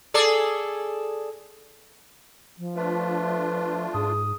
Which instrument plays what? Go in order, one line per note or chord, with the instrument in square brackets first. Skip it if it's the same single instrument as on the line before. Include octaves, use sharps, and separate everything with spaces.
[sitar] G#4 A4 D5
[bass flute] F3
[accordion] A3 D4 F4 [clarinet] B4
[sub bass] G#2 [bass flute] G#4 [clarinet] D#6